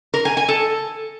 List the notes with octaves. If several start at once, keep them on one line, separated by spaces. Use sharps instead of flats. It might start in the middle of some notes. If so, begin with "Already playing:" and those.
A#4
G#5
G#5
A4